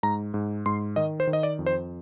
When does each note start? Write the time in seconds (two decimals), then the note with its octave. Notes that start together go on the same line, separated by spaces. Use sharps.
0.03 G#2 A#5
0.34 G#2
0.66 G#2 C6
0.96 D#3 D#5
1.20 C5
1.27 D#3
1.33 D#5
1.43 D5
1.59 F2
1.66 C5